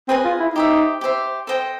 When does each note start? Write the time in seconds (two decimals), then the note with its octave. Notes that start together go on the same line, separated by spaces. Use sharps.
0.08 C4 G#4 B4 D#5 G#5
0.25 F4
0.40 E4
0.55 D#4 G4 C5 E5
1.01 G4 C5 E5
1.47 A4 C5 D#5 G5